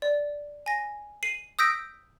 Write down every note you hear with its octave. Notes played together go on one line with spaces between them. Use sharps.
D5
G#5 A#6
C7 D#7 F#7
D#6 E6 G6 A#6 B6 D7